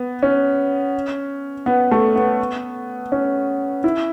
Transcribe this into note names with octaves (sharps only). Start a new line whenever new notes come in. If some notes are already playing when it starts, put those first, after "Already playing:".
Already playing: B3
C#4
B3
A3
B3
C#4
E4